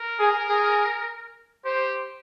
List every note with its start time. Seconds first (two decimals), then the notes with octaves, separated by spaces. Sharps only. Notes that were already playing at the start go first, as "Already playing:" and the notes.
Already playing: A#4
0.19 G#4
0.49 G#4
1.65 G4 C5